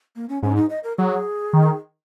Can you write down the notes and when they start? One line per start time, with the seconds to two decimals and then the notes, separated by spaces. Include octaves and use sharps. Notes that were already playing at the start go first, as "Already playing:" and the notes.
0.16 A#3
0.29 C#4
0.43 G#2 C#4
0.56 D#4
0.70 D#5
0.84 A#4
0.98 F#3 G#4
1.53 D#3